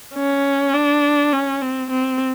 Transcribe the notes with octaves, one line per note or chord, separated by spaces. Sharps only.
C#4
D4
C#4
C4
C4